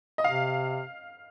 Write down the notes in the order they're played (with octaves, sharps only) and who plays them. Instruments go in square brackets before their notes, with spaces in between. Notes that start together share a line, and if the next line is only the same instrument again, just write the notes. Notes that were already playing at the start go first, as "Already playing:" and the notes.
[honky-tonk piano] D#5
[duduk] C3 [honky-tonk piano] F5